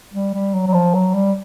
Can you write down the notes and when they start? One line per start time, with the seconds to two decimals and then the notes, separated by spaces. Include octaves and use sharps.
0.14 G3
0.34 G3
0.54 F#3
0.67 F#3
0.74 F3
0.94 F#3
1.14 G3